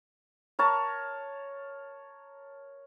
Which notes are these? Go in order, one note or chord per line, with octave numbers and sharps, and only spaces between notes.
A#4 C#5 A5